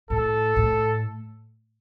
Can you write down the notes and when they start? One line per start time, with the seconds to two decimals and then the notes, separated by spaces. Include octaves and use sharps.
0.10 A2 A4
0.56 A2